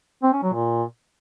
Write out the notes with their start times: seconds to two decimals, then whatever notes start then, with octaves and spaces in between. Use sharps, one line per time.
0.23 C4
0.33 C#4
0.43 F#3
0.53 A#2